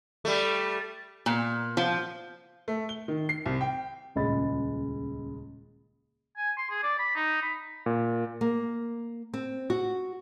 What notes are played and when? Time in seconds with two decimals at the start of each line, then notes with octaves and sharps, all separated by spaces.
0.25 G3 A3
1.26 A#2
1.77 F3
2.68 A3
2.89 G7
3.08 D#3
3.29 C7
3.46 C2
3.61 G5
4.15 D#1 C#2 G#3 D#5 B5 A6
6.37 G#5
6.57 C6
6.71 G#4
6.83 D5
6.99 B5
7.16 D#4
7.42 B5
7.86 A#2
8.41 A#3
9.34 C4
9.70 F#4